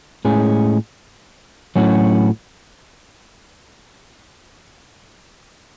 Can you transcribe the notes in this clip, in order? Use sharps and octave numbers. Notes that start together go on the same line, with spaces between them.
A2 G#3 C#4 G#4
A2 F#3 C#4 F#4